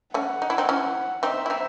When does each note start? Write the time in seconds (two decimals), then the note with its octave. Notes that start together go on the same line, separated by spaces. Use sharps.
0.14 A3 C#4 F#5
0.42 D#4
0.50 E4
0.58 C4 D#4
0.69 C#4 E4
1.23 C4 D#4 E5
1.46 E4
1.50 C4 D#4